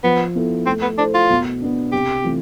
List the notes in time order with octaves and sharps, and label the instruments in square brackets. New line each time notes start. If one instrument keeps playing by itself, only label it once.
[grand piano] F3 [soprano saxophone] B3
[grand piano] B3 E4 A4
[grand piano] A3 [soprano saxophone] C4
[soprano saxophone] B3
[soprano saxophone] D4 [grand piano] E4 A4 C5
[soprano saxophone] F4
[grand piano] B2
B3 D4
[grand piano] C3 [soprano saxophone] G4
[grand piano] E3 A3 C4 F4